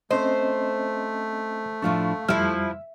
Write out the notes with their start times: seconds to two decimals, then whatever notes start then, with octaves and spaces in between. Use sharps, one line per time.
0.11 A3 C4 C#4 C5 D#5
1.82 A2 F3 D4 F5 C#6
2.29 F2 F3 G3 E4 E5 F6